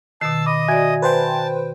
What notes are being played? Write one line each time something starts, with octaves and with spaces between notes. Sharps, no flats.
B2 D#3 A5 E6 C7
D#5 B5 D6 D#6
F#4 D5 E5 G#5 G#6
B4 C5 G5 A5